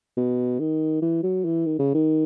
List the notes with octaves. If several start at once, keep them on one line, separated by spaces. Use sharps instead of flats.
B2
D#3
E3
F#3
E3
D#3
C#3
D#3